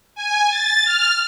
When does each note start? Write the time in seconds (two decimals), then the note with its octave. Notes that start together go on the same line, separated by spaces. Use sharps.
0.15 G#5
0.49 A6
0.84 F6